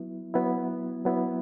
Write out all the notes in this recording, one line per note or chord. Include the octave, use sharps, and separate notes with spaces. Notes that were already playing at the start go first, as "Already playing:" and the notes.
Already playing: F#3 B3 E4
F#3 B3 E4
F#3 B3 E4